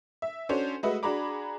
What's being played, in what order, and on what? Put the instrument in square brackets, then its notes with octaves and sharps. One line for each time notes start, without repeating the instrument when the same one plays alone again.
[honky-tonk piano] E5
C#4 D4 F#4 A4 C5 C#5
G#3 A3 F#4 B4 D#5 E5
D4 F#4 G#4 A#5 B5 D6